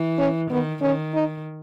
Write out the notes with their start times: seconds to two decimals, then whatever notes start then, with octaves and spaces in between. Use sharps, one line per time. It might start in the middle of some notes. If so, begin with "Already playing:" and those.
Already playing: E3
0.18 C#4
0.50 D#3 B3
0.82 D#3 C#4
1.14 D#4